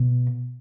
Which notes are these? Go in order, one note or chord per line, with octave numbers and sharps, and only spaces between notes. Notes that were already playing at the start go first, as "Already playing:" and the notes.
Already playing: B2